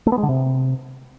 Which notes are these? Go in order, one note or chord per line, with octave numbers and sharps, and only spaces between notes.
A3
B3
G#3
D3
C3